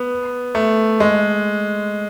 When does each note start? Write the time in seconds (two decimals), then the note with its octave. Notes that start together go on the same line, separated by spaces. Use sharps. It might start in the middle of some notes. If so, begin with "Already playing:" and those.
Already playing: B3
0.55 A3
1.00 G#3